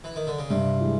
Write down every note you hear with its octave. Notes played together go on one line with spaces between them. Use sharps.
E3
D#3
D3
C#3
G2 C3
E3 G#3